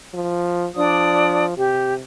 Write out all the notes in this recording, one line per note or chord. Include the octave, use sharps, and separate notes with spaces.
F3
F3 D4 D5 D#6
C3 G4